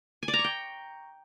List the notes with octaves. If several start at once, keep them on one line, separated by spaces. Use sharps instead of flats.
G#5
D5
A#5
C#6
G5